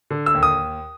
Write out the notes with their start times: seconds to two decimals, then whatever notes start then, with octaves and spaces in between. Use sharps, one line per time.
0.10 D3
0.26 E6
0.34 D#2
0.43 D#6